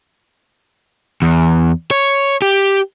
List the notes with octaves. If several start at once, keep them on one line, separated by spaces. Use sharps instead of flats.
E2
C#5
G4